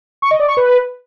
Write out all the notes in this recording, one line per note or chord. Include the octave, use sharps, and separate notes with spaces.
C#6
D#5
D5
C#6
B4